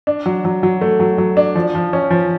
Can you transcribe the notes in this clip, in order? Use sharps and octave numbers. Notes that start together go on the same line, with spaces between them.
D4
F#3
F#3
F#3
A3
F#3
F#3
D4
F3
F3
C#4
F3